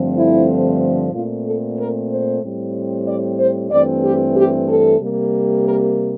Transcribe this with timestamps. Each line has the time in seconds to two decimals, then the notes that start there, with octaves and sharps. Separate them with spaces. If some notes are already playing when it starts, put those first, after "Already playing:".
Already playing: G2 D3 F3 A3 C4
0.16 E4
1.12 A#2 A3 C4 F4
1.45 A4
1.77 A#4
2.09 C5
2.42 A2 G3 C4
3.06 D5
3.38 C5
3.70 G2 E3 A3 C4 D5
4.03 G4
4.35 G4
4.67 A4
4.99 C3 G3 A#3
5.64 A#4